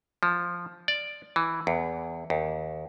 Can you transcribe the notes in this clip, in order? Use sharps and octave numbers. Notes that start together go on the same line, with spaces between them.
F3
D5
E3
E2
D#2